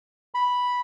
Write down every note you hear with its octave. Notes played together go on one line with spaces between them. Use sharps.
B5